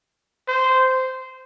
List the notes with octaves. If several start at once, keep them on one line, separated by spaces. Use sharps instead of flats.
C5